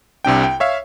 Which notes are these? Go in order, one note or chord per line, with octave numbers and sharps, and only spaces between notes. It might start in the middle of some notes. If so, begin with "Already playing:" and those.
C2 C3 D4 G5
G5
C#5 E5 F5